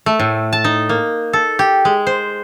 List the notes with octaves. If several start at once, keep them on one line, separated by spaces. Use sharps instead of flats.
A3
A2
A5
D#4
A#3
A4
G4
G#3
C5